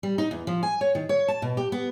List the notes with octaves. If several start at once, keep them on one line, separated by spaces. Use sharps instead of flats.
G3
D#4
E2
F3
G#5
C#5
D#3
C#5
A5
B2
G4
B3